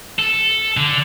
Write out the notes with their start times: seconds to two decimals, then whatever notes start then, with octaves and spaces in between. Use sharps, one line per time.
0.19 A4
0.77 D3